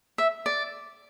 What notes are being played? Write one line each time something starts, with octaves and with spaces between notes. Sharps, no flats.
E5
D5